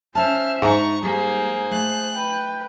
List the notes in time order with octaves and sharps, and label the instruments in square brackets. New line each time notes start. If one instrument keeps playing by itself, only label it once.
[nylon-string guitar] C#4 A5 [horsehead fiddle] C5 E5 [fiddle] F6
[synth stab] G#2 [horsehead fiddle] D4 [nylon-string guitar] D#4 E5 F#5 [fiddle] A#5 C#6
[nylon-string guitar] G3 [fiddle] A#3 [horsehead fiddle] G#4 C5
[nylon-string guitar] A3 [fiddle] F#6
[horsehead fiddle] B4 G5